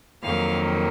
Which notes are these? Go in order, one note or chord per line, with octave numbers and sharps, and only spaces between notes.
F2 D#3 F#3 A#3 F5